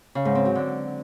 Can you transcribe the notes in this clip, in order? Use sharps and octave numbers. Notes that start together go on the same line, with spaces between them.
C#3
G#2
C4
F#3
D3